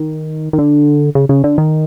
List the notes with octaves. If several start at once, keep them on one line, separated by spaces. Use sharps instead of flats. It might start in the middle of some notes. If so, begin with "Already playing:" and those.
Already playing: D#3
D#3
D3
C#3
C#3
D3
D#3